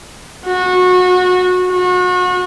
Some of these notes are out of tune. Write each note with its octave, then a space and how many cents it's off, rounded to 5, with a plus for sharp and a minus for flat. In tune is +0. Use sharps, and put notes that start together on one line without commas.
F#4 -25
F#4 -35